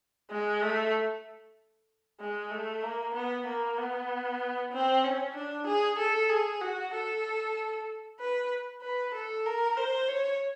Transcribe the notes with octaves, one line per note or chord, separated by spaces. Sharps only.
G#3
A3
G#3
A3
A#3
B3
A#3
B3
C4
C#4
D4
G#4
A4
G#4
F#4
A4
B4
B4
A4
A#4
C5
C#5